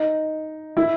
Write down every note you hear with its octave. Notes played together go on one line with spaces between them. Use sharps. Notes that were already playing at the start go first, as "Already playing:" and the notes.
Already playing: D#4
E4